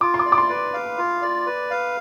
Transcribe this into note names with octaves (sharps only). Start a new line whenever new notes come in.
F4 D6
C6
D6
D5
D6
C6
B4
F5
F4
D5
B4
F5